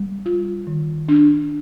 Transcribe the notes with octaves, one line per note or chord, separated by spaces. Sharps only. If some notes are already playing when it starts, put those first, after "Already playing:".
Already playing: G3
F4
D#3
D4